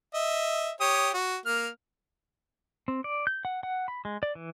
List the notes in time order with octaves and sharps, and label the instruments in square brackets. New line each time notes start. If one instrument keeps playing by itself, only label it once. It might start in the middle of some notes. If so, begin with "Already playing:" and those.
[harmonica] D#5 E5
G4 C#5 D#6
F#4
A#3 F6
[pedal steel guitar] C4
D5
G6
F#5
F#5
B5
G#3
D5
E3